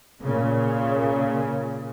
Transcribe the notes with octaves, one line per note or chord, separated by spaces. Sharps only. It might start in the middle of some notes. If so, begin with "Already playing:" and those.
A#2 C#3